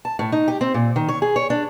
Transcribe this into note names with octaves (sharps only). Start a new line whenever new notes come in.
A5
A2
D#4
G4
C4
A#2
D#3
C#5
G#4
C#5
D4